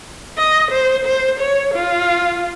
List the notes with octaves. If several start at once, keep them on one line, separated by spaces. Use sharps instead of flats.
D#5
C5
C5
C#5
F4